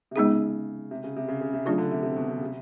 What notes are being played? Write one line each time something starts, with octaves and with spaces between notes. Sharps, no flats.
C3
C#3 G#3 B3 D#4 G#4
C3
C#3
C3
C#3
C#3
C3
C#3 F#3 A3 D4 F4
D3
C3
C3
B2
C3
C#3
C3